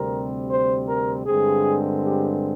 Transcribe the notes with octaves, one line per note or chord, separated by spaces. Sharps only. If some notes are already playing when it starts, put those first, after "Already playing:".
Already playing: D2 C3 G3 C4 A#4
C5
A#4
G2 D3 G#3 C4 G#4
G4